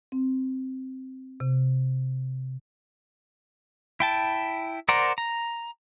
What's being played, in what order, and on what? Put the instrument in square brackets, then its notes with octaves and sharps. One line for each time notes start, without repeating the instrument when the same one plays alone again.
[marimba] C4
C3
[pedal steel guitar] E4 G5 A5
A#4 C5 D5 F#5 A#5
A#5